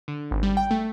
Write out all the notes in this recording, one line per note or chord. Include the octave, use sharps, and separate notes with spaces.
D3
G#1
G3
G5
A3